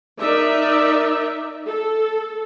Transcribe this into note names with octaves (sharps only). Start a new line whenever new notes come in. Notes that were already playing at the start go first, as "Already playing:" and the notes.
D#4 A#4 D5 E5
A4